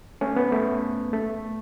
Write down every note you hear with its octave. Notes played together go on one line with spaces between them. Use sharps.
A3 C#4
B3
A3
A3